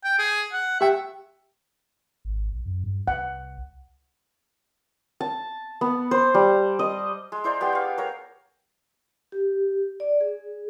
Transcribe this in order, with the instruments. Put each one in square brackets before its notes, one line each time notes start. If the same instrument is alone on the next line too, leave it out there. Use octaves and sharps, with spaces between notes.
[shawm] G5
G#4
F#5
[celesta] G4 G5 [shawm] E5
[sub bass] G#1
B1
F#2
G2
[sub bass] C2 [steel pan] F#5
[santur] A5
B3
C5
G3
D#5
G#3
E4 C5 D5 A#5
B3 G4 G#4 G5
F5 C#6
A#4 C#5 A#5
[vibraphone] G4
D5
G#4